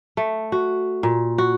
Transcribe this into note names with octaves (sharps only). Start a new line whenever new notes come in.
A3
F#4
A#2
F#4